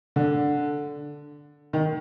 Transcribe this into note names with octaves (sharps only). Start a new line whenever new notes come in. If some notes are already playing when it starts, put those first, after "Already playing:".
D3
D#3